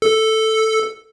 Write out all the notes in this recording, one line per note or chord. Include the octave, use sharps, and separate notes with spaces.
A4